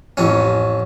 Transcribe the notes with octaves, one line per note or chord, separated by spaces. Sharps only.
A1 F2 C#4